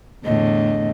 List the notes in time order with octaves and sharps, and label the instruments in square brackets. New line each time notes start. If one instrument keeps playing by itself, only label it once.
[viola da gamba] E2 A2 D3 [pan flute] D#5